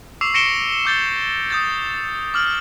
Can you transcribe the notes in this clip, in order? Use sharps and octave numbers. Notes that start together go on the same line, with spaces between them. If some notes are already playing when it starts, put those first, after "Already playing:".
C#6 D6 E6 C7 F7
C#6 A#6 C#7 D7 E7 G7
D6 G6 A6 G7
D#6 G6 A6
D6 F6 F#7